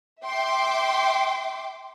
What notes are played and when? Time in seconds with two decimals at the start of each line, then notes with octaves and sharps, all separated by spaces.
0.25 E5 G5 C6 D6